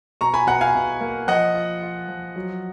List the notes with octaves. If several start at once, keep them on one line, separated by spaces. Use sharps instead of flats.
B2 A#5 C#6
G#5 B5
B2 F#5 A#5
F5 G#5
B2
A#3
F3 D#5 F#5
F4
F4
F3
F#3